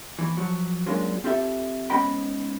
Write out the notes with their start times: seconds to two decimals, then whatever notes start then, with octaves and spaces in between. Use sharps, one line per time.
0.19 D#2 E3
0.37 F3 F#3
0.86 F#3 G#3 A#3 C#4 D4 F4
1.24 C4 F4 G4 A4 E5
1.90 G#2 B3 C#4 D#5 G5 B5